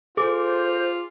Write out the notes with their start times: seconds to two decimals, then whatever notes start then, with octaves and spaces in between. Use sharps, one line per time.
0.17 F4 G#4 A4 C5 D6